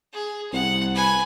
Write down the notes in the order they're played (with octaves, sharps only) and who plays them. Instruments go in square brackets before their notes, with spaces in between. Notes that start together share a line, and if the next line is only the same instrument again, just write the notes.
[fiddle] G#4
[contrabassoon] C2 [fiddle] F#5
[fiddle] B4 G#5